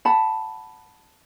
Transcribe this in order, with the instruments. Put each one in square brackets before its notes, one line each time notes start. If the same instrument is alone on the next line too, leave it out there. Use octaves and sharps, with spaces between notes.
[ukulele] F#5 A5 B5